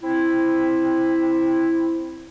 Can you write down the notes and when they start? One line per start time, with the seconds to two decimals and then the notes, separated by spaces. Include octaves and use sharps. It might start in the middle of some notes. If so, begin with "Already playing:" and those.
0.02 C4 E4